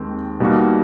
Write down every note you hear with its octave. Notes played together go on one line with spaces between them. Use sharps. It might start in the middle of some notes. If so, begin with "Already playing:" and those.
Already playing: D#2 D#3 G#3 C4
B2 G3 A#3 D#4 F#4